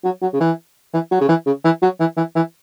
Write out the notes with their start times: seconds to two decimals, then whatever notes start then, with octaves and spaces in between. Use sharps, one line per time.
0.04 F#3
0.22 F#3
0.33 C#3
0.40 E3
0.94 E3
1.11 F#3
1.21 C#3
1.29 E3
1.46 C#3
1.64 E3
1.82 F#3
2.00 E3
2.17 E3
2.36 E3